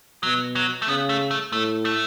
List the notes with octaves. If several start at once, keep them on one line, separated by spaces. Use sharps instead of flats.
B2 F#3
F#3
A3
C#3 B3
A3
A3
A2 A3
A3